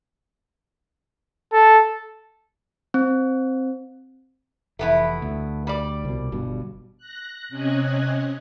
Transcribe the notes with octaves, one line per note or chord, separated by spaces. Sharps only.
A4
C4
F1 E3 A3 B3 E4
D2
G3 D5
C2 B2
G1 G2 B2
F#6 A#6
C3 C#4 D#5 F#6 G#6